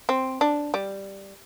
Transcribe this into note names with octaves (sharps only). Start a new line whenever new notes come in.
C4
D4
G3